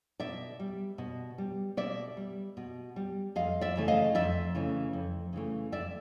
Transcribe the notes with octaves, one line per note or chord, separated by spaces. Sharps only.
B2 D5 E5
G3
B2
G3
B2 D5 E5
G3
B2
G3
F2 D#5 F5
D5 E5
C#3 E3 A3
D#5 F5
F2 D5 E5
C#3 E3 A3
F2
C#3 E3 A3
F2 D5 E5